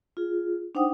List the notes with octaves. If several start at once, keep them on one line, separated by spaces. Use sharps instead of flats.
F4 G#4
D4 D#4 C5 F#5 G5 D#6